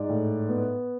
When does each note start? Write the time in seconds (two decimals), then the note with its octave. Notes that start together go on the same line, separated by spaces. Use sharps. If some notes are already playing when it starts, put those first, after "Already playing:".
Already playing: G#2 D5
0.09 A2
0.48 B3